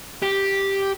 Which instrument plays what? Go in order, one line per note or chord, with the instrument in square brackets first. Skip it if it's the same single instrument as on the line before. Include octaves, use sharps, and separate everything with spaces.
[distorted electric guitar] G4